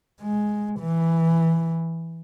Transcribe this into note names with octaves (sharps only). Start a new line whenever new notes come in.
G#3
E3